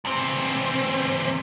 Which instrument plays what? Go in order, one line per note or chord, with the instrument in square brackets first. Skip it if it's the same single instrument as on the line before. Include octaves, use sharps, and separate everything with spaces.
[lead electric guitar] E2 C4